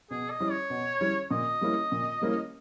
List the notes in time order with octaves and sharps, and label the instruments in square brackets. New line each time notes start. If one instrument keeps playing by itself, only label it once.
[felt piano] B2 [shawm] G#4
[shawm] D#5
[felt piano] G3 C#4 E4
[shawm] C#5
[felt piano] B2
G3 C#4 E4
[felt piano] A#2 [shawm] D#5
[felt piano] G3 A#3 C#4 E4
A#2
G3 A#3 C#4 E4